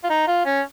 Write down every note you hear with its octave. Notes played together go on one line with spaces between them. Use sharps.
F4
D#4
F4
C#4